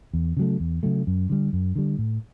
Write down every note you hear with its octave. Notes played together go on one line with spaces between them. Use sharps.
E2
C#3 F#3 A3
E2
C#3 F#3 A3
F#2
D3 G3
F#2
D3 G3
A2